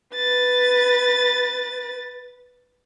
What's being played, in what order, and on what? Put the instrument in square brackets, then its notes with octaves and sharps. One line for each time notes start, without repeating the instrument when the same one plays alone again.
[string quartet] B4 A6